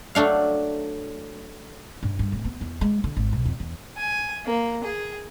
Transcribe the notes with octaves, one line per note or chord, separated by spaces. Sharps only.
F#3 A3 D4 F5
G2
G2
D1
B3
E2
G#3
D3
G#1
B1
F2
E2
G#5
A#3
G#4